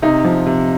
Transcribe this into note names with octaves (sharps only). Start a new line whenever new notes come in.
C3 D#4
F3
C3